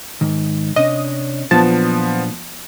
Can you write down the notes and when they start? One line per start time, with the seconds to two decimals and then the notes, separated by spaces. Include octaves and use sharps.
0.21 G#2 D#3
0.76 C3 C#4 D4 D#5
1.51 A#2 F3 F#3 B3 D4 A5